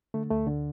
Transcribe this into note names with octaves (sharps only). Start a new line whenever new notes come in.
D3 A3
D2 A3
D3